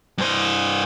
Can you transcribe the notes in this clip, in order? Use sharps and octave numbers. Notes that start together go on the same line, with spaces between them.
G2 C5